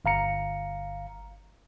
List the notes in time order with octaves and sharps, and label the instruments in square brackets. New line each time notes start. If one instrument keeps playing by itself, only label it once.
[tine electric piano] G1 F5 A#5 C#7